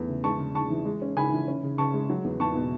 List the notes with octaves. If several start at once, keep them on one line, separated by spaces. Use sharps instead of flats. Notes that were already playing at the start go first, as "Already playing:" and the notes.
Already playing: E2 A3
C#3
G#3 A5 C#6
C#3
C#3 A5 C#6
E3
G#3
C#4
C#3 G#5 B5
E3
C#4
C#3
C#3 A5 C#6
G#3
F#3
E2
E2 A5 C#6
B2